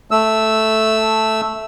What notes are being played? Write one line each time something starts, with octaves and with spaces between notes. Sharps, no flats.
A3 E6